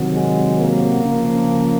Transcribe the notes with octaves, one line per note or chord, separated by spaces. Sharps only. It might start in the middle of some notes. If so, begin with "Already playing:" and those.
Already playing: C3 D#3 F#3
G#3
A#3
C#3 F3